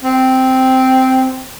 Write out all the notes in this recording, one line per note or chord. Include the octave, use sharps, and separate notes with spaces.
C4